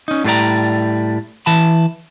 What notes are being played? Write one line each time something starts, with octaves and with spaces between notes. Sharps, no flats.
C#4 D#4
A2 G3 C5 D5 A#5
E3 A5 B5